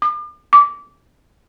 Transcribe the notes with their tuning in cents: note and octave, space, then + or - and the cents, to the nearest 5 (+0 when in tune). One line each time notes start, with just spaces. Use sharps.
D6 +40
D6 -20